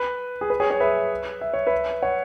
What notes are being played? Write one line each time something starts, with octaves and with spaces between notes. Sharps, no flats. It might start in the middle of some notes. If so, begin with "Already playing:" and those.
Already playing: B4
G#4
B4
G#4 C#5
G#4 C#5
B4 E5
E5
C#5
B4 E5
C#5 F#5